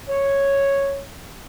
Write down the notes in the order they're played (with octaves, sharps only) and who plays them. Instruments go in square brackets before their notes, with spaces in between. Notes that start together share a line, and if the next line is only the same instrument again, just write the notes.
[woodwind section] C#5